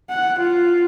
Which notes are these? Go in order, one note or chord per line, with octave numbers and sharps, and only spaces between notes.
F#5
F4